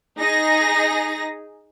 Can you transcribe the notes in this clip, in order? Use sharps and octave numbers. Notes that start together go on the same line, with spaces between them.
D#4 G#4 A#6